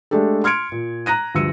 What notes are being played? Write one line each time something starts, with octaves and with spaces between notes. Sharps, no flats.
G#3 A3 D4 G4 A4
C6 F6 G#6 C#7 D7
A#2
A#5 F#6 A#6 D#7
D2 G2 F3 E6 C#7 D#7